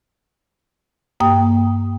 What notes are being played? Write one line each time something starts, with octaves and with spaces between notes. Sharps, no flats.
G2 A#3 G5 D#6